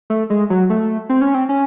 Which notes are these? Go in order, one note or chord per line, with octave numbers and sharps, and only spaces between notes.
A3
G#3
F#3
A3
C4
C#4
C4
C#4